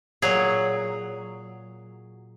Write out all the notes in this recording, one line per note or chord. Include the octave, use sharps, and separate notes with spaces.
A#2 F#3 G#4